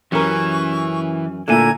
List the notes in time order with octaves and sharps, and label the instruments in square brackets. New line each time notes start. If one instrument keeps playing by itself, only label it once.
[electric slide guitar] F#2 C#4 [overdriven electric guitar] E3 [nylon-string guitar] G4 A#4 [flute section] C#6
[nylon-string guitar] A#2 A3 [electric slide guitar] D3 A#3 G#5 [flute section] E4 A#5 G#6